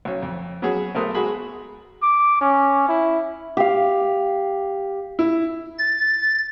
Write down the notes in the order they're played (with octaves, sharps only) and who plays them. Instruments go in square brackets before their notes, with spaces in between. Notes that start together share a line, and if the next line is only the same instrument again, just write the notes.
[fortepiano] B1 C#4
F2
F#3 B3 C#4 F#4 G#4
B1 A3 B3 A#4 C5 D#6
G#3 F#4 G#4 B5
[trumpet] D6
C#4
E4
[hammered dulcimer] G4 F5
[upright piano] E4
[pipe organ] A6